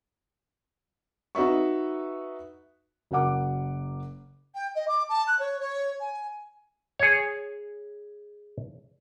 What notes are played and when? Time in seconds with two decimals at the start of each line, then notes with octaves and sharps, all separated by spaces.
1.35 D#4 F#4 B4 E5 C#6
3.11 F#1 F#4 A#4 F#5 D6
4.54 G5
4.75 D#5
4.88 D6
5.09 A5
5.27 F#6
5.39 C#5
5.59 C#5
6.00 G#5
6.99 G#4 C#5